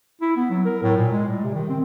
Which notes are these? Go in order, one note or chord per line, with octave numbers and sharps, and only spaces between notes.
E4
B3
F#3
A#4
A2
A#2
G#3
G3
C3
D#3
C4